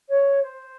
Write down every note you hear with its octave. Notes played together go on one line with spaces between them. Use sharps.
C#5
C5